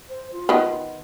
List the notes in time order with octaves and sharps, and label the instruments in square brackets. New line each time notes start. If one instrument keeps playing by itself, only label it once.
[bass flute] C5
F4
[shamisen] D#3 B3